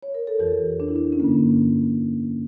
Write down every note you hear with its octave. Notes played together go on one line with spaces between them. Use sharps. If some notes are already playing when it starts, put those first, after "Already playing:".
C#5
A#4
A4
F2 E3 G4
D4
E4
D4
C#4
G2 D3 A#3